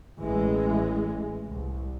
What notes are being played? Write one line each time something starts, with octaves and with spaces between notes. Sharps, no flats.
A1 E3 G#3
C2